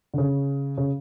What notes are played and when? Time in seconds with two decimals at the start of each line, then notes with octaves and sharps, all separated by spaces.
0.14 D3
0.18 C#3
0.78 C#3